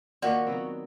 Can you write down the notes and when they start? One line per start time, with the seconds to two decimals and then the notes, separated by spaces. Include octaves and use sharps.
0.22 A#2 D#3 F4 F#4 C#5 D5
0.47 F#3 B3 C4